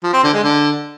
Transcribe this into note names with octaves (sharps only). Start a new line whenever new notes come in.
F3
C4
D3
G#3
D3